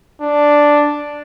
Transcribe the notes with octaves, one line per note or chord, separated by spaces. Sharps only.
D4